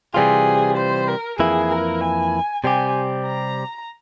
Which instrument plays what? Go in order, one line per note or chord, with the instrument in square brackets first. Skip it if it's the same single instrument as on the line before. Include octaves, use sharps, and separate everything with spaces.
[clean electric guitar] C3 E3 G3 C4 F4 [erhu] G#4
[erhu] C5
A#4
[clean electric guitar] F2 E3 A#3 E4 [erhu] G#4
[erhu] A#4
G#5
[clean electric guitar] C3 G3 C4 G4 [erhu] G#5
[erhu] A#5